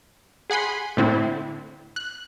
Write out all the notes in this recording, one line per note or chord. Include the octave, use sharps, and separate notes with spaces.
G#4 F#5 G#5 B5 C6
A2 D3 C4 D4 E4
F#6